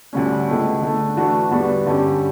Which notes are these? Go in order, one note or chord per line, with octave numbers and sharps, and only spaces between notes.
D2 D3 G3 C#4
C#2 B2 A3
D3 A3 D4
E3 A3 D4 F#4
E2 D3 G3 B3 F#4
G2 D3 G3 C#4 G4